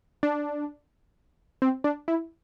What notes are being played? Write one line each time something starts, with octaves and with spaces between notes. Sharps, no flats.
D4
C4
D4
E4